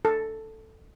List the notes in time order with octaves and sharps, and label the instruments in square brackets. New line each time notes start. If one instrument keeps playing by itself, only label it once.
[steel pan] A4